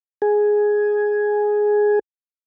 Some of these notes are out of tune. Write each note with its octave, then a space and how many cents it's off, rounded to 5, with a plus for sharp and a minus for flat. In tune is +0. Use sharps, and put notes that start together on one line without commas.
G#4 +5